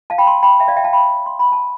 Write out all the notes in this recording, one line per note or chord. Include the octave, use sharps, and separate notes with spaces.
F5 A5
G5 B5
A5 C6
G5 B5
E5 G5
D5 F5
E5 G5
F5 A5
G5 B5
C6
B5
A5